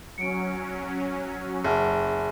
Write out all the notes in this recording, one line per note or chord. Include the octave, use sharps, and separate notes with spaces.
F#3 C#4 C#7 D7
F#1 G#4 E5 F#5 A5 F6